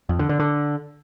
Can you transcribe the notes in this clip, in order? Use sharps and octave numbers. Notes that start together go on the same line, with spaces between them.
F2
D3
D3
D3